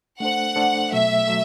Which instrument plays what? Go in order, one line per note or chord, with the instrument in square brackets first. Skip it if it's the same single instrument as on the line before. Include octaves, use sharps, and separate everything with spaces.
[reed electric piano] A3 D4 A4 C5 [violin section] F#5
[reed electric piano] A3 D4 A4 C5
[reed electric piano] B2 F#3 A3 [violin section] E5
[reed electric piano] F#3 A3